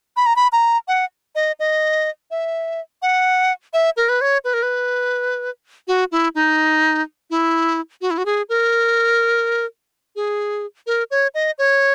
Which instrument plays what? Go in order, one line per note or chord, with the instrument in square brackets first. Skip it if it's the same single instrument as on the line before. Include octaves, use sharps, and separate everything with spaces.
[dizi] B5
A#5
B5
A#5
F#5
D#5
D#5
E5
F#5
E5
A#4
B4
C#5
B4
A#4
B4
F#4
E4
D#4
E4
F#4
E4
F#4
G#4
A#4
G#4
A#4
C#5
D#5
C#5